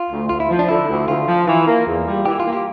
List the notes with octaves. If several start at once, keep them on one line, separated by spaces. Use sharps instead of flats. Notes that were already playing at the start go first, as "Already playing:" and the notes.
Already playing: F4
D2
D2 F4
E4
F3
D4
D3 E4
D2
D2 F4
F3
E3
A#3
E2
G3
E3 G4
F4
A#3
G4